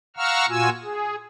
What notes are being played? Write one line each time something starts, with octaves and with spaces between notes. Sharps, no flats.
F5 F#5 A#5 C#6 E6 F6
A#2 F4 F#4 G#5 E6
G#4